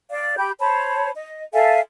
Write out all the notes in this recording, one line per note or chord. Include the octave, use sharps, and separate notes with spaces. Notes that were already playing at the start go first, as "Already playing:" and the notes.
D5 F5
G4 B5 G6
C5 C#5 A5 B5
D#5
A4 E5 F5 G#5